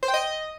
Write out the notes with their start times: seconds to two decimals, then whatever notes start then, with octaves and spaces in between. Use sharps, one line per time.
0.03 C5
0.08 G5
0.14 D#5